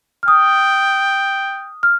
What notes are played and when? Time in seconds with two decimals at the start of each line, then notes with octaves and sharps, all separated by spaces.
0.23 F6
0.27 G5 D#6
1.83 F6